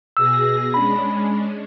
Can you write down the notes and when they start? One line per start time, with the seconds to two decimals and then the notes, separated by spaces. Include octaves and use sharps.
0.17 B2 G#4 E6 A#6
0.74 G#3 C#4 D4 B5